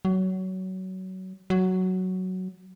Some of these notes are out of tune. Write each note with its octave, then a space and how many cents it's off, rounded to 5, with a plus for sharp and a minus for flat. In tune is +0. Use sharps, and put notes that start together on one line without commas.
F#3 +20
F#3 +5